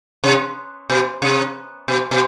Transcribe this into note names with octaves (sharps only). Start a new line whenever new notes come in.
C3
B2
C3
B2
B2